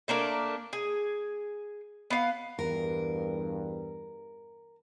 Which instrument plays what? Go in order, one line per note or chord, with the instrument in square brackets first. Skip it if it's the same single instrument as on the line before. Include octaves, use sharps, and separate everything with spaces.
[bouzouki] A3 A#3 D4 A#4
G#4
B3 F5
[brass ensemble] E2 G2 [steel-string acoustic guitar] A#4